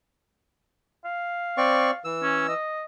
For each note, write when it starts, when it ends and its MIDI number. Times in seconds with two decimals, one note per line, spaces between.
1.05 2.04 77
1.57 1.91 60
1.57 1.91 74
1.57 1.91 85
2.05 2.54 52
2.05 2.54 88
2.23 2.44 61
2.48 2.85 75